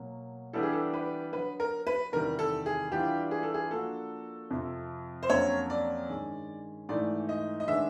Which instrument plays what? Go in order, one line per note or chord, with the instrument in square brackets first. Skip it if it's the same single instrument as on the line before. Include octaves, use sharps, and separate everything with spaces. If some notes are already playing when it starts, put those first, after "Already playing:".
Already playing: [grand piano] B2 F#3 A#3
[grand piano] E3 G3 B3 D4 G4 [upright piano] A4
[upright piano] G#4
A4
B4
[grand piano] D3 F#3 B3 [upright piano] B4
[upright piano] A#4
B4
[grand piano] E2 C3 D#3 G3 [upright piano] A#4
[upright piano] A4
G#4
[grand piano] E3 G3 B3 D4 F4 [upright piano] G4
[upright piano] G#4
A4
G#4
[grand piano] F3 A#3 D4 F#4 [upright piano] A4
[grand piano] F2 C3 F3
[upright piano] C5
[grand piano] F2 D3 F#3 A#3 C#4 [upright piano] C#5
[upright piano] D5
[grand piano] G2 D#3 G#3 C#4
[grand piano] G#2 E3 A3 [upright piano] D5
[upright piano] D#5
D#5
[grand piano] D#3 G#3 B3 D4 [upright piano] E5